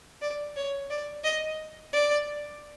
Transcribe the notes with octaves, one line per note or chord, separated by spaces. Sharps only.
D5
C#5
D5
D#5
D5